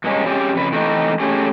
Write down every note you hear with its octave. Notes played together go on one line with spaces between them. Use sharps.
G2 G#3 A#3 C#4
C4 C#4 G4 G#4 A#4 D5
F2 C#3 B4
E3 A3 C4 D4 D#4
A3 C#4 G4 G#4